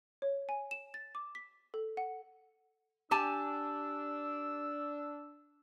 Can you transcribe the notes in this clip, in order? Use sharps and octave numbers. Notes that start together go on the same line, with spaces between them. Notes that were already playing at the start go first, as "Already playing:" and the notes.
C#5
G#5
E7
A6
D6
B6
A4
F#5
D4 G4 G#5 A5 E6